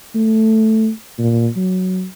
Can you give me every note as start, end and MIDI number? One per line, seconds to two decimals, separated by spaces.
0.15 0.90 57
1.18 1.48 46
1.56 2.06 54